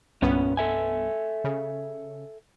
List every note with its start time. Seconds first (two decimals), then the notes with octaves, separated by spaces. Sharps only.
0.22 C2 G2 A#2 B3 C#4
0.57 A4 E5 G#5
1.44 C#3